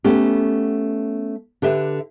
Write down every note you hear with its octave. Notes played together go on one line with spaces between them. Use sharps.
A3 B3 C#4 G4
D3 G4 B4 E5